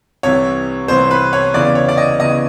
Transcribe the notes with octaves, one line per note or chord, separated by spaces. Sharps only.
C2 C3 E3 C#5
C2 C3 E3 C5
B4
C#5
E2 C#3 E3 D5
C#5
D5
D#5
E2 C#3 E3 D#5